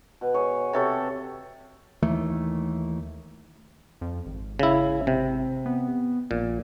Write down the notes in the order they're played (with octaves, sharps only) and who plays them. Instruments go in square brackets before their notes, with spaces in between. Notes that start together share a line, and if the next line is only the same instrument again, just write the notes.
[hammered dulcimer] B2
G#4 C#5
C3 A4 C#5
[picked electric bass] D#2 D#3 E3 A3
[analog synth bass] F2
G#1
[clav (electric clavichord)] C#3 E4
C3
[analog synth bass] B3
[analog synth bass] A#1 [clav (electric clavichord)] A#2